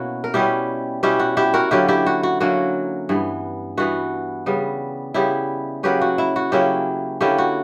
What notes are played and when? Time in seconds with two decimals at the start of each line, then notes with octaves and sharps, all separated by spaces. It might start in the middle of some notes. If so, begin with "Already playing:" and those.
Already playing: B2 A#3 C#4 E4 F#4
0.24 A#4
0.34 B2 G3 C#4 E4 G4
1.03 B2 G3 C#4 E4 G4
1.19 F#4
1.37 E4 G4
1.54 F#4 A#4
1.71 D3 F#3 A#3 C#4 E4 G4
1.88 E4 G4
2.06 F#4
2.23 F#4
2.41 D3 F#3 A#3 C#4 F#4
3.09 G2 E3 B3
3.77 G2 E3 B3 F#4
4.46 C#3 G3 B3
5.14 C#3 G3 B3 E4 G4
5.83 C#3 F#3 A#3 C#4 G4 B4
6.01 F#4
6.18 E4
6.36 F#4
6.52 C#3 F#3 A#3 C#4 E4 G4
7.21 D3 A#3 C#4 E4 G4
7.38 F#4